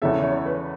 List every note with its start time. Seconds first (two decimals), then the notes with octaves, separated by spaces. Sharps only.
0.02 E2 C#3 E3 C#4 A4 E5
0.23 C#5
0.46 B4